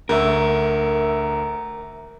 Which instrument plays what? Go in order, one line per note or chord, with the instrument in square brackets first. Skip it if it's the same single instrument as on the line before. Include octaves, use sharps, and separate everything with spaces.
[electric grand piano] D2 [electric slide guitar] A#4 E5